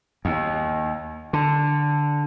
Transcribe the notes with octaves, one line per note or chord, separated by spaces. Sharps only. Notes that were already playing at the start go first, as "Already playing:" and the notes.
D#2
D3